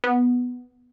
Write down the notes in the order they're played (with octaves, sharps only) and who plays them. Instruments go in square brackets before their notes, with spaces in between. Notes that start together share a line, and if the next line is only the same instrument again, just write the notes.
[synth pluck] B3